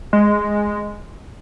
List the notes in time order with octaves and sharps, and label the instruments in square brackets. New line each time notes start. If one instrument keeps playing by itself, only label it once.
[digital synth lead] G#3